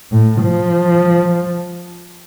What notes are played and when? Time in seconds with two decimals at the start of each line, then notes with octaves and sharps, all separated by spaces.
0.12 A2
0.42 F3